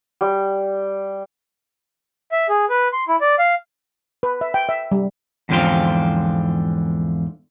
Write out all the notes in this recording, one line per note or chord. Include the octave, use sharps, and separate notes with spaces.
G3
E5
G#4
B4
C6
E4
D5
F5
B4
E5
G5
E5
G3
E2 G#2 D3 F3 C4 F4